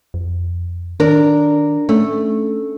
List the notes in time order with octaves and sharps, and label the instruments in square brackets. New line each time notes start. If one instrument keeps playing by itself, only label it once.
[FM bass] F2
[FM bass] D#3 [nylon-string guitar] D4 A#4
[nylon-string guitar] A3 [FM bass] C#4